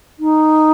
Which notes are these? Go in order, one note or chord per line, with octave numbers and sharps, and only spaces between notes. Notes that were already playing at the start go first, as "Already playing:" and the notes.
D#4